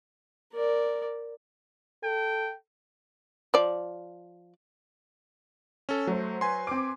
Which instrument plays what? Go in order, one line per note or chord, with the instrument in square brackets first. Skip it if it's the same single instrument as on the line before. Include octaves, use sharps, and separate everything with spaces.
[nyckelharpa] A#4 D5
[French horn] A4 [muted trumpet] G5
[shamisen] F3 D5
[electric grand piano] C#4 A4
[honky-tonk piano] F#3 C5 [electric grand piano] A3
[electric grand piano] B4 G#5 C6
[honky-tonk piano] C4 D6